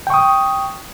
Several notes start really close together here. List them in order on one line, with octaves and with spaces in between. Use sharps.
G5 C#6 D#6